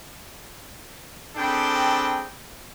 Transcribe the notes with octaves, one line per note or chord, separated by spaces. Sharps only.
C4 D4 G#4 A4 G5 B5